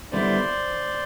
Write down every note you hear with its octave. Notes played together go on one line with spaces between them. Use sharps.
D3 G3 B3 E4 C5 D5